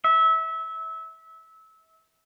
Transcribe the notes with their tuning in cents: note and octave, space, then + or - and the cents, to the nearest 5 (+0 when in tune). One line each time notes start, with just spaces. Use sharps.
E5 -25